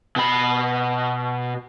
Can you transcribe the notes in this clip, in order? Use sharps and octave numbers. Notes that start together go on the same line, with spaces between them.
B2 B5